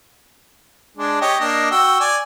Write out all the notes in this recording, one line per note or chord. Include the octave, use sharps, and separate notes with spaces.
G#3 D4
G4 C#5 D#5
A#3 D4 D#5
F#4 G5 E6
D5 G#5